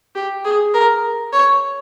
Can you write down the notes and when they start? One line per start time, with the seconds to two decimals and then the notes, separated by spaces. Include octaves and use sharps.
0.15 G4
0.45 G#4
0.74 A#4
1.33 C#5